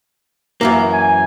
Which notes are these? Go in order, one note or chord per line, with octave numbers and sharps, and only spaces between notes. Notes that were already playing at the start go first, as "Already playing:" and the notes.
F#2 E3 A#3
G#5